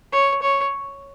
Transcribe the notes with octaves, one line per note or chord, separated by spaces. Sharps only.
C#5
C#5